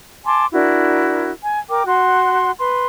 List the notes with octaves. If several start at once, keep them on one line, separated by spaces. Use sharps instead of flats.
G#5 A5 C6 D6
D4 E4 F#4 A#4
G#5
A#4 G5 D6
F#4 F#5 C6
B4 C6